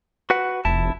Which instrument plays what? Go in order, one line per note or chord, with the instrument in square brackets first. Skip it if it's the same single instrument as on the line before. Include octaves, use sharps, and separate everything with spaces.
[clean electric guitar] F#4 B4 F#5
[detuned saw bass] F1 [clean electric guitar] E4 A5